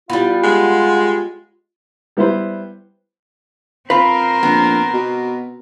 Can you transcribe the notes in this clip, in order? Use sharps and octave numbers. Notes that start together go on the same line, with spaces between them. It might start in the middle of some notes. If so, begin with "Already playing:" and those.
G3 B3 E4 F4
G#3 F#5
G3 B3 E4 B4 C5
C4 F4 A#4 B4 B5
A#1 B3
B2